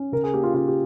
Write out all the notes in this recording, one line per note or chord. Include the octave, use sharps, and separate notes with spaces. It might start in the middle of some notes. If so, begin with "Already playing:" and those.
Already playing: C#4
C#3 A#4
G#4
A#3 G4
F4
C#3 F4
G4